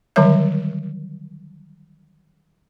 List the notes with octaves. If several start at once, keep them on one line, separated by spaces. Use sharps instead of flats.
D3 D#3 F#3 G3 C#5 E5